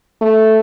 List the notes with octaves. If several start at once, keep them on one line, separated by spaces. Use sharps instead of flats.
A3